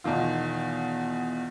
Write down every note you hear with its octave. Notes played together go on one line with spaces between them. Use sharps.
E2 B2 D#3 F4